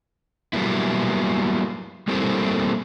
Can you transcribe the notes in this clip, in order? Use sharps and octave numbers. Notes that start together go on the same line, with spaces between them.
F#3 G3 A#3 B3 E4
G3 A3 A#3 C4 E4 G4